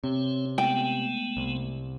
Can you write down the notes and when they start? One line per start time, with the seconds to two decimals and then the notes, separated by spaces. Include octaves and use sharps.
0.04 C3 C4 C#5
0.58 G#3 A3 B3 G5
1.37 C2